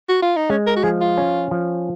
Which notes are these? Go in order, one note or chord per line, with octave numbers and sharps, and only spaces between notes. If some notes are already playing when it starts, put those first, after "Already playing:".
F#4
F4
D#4
G#3 C#4
A#4
F#4
F3 G#4
F4
C#4
F3